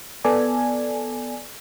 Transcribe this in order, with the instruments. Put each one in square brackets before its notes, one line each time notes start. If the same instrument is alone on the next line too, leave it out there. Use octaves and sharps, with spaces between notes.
[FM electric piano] B3 A4 D5 G#5